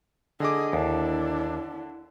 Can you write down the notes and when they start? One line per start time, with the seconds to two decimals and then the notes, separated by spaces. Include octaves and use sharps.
0.40 D3 G#4 D#5 D6
0.73 D#2 D4 E4